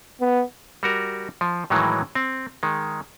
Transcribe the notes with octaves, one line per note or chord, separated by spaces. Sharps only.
B3
G3 F#4 A#4
F3
A2 D#3 E3 F#3 G#3
C4
D#3 G#3